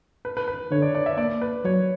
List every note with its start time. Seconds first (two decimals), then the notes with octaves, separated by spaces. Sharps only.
0.25 B4
0.37 B4
0.48 B4
0.71 D3 C#5
0.82 D5
0.95 D5
1.06 E5
1.17 A#3 D5
1.41 B4
1.65 F#3 C#5